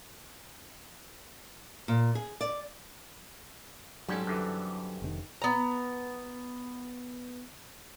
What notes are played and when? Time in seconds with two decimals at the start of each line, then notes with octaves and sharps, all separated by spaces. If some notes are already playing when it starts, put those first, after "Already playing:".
1.88 A#2
2.15 G#4
2.41 D5
4.08 G#2 F#3 G3 C4 C#4 A4
4.27 F#2 D3 E3
5.02 F1 C3 D#3
5.42 B3 A#5